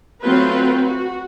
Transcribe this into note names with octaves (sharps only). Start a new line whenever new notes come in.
F#3 A3 C4 F4 B4
F#4